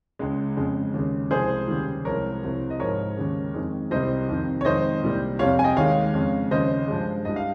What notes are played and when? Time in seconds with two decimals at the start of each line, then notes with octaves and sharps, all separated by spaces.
0.19 C#2 C#3 G#3
0.57 F2 C#3 G#3
0.94 D#2 C#3 G#3
1.31 C2 C3 F3 G#3 G#4 C5
1.68 D#2 C#3 G3
2.05 C2 C3 F3 G#3 A#4 C#5
2.43 C2 C3 F3
2.70 D#5
2.79 G#2 F3 G#3 A#4 C#5
3.17 D#2 C#3 G#3
3.54 F2 D#3 G#3
3.91 C2 C3 G3 C5 D#5
4.29 F2 C3 D#3
4.61 C#5
4.65 F2 D#3 G#3 C5 D#5
5.03 C2 A#2 G3
5.39 F2 C3 G3 C#5 F5
5.59 G#5
5.64 D#5 G5
5.76 D#2 D#3 G#3 C#5 F5
6.14 F2 C#3 G#3
6.51 D#2 C#3 F3 C5 D#5
6.88 G2 F3 G#3
7.25 G2 G3 D#5
7.36 F5